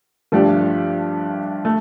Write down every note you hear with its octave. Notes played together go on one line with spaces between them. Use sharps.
G2 F3 A3 D4 G4
A3